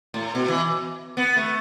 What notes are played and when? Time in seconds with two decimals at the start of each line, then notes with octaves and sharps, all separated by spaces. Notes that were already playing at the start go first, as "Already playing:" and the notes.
0.14 A2
0.35 B2
0.48 E3
1.17 B3
1.36 A3